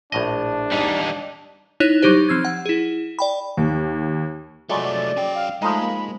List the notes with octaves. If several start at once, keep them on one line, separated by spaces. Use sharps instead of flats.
A#1 A2 D4 D#5
G3 D#4
D#4 E4 C#5 F#6 F7
F#3 G3 D#4 G4 C5
F3 C4 E6 G#6
F#5
E4 G#4
D5 G5 B5
D#2
F3 F#3 G#3 A3 D5
A6
C#4 G5
F5
F3 G#3 A3 D#4 B5
A#3